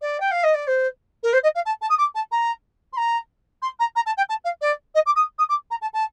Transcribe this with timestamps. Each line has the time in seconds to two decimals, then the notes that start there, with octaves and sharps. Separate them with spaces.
0.01 D5
0.20 G5
0.31 F5
0.43 D#5
0.54 D5
0.67 C5
1.23 A#4
1.33 C5
1.43 D#5
1.54 F5
1.65 A5
1.81 A5
1.89 D#6
1.98 D6
2.14 A5
2.31 A#5
2.92 C6
2.97 A#5
3.62 C6
3.79 A#5
3.95 A#5
4.05 A5
4.17 G5
4.29 A5
4.44 F5
4.61 D5
4.94 D#5
5.05 D6
5.15 D#6
5.38 D#6
5.49 D6
5.70 A#5
5.81 A5
5.93 A5